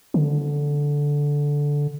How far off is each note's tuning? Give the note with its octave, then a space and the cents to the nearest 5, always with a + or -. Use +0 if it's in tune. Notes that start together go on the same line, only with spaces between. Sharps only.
D3 -10